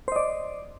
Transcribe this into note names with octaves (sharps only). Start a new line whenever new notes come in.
C5 D5 D#5